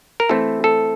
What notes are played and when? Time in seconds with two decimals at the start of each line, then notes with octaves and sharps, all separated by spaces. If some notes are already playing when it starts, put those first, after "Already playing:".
0.20 A#4
0.29 E3 A3 C4 E4 A4
0.64 A4